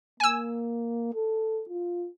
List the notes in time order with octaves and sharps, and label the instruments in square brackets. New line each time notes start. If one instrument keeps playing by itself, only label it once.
[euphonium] A#3 [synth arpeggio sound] G#5 E6
[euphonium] A4
F4